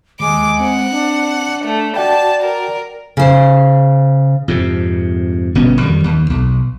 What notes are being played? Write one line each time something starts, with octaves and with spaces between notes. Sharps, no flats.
D#2 G#3 D6
C4 F#5
D4
A3
F#4 D5 F#5 G5 A5
A#4
C#3 C5
F2 G#2 C3
G1 B2 B3 C#4
F2 D#3 G3
D#2
B1